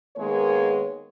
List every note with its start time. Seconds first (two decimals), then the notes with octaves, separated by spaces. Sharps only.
0.17 D#3 G#3 A#3 B3 G#4 C#5